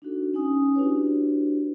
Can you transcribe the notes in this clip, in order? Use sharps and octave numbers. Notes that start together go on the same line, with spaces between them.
D4 D#4 F#4 A4
C#4 D#4 G#5 D#6
D4 E4 F#4 G4 B4 C#5